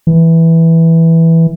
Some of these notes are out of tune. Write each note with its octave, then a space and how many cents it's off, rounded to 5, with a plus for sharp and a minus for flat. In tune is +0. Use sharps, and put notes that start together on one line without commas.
E3 -5